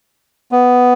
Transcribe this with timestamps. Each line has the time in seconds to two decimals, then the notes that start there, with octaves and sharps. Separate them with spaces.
0.52 B3